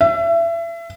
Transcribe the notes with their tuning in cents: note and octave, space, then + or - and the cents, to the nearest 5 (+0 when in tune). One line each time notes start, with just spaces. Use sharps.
E5 +30